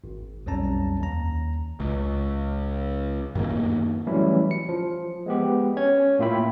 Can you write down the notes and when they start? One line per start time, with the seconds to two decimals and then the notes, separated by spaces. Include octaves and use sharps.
0.04 G#1
0.46 B1 F2 G3 C#4 A5 A#5
1.00 D#2 A#5
1.80 C#2
3.35 F#2 D#3 A#3
4.06 E3 F#3 G3 A3 C#4 E4
4.51 C#7
4.69 F3
5.26 G#3 B3 G4
5.77 C#4 C#5 G#6
6.19 A2 A#3 F4 E5 G5 B5